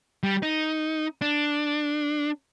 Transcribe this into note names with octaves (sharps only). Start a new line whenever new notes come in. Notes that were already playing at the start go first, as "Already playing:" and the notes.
G3
D#4
D4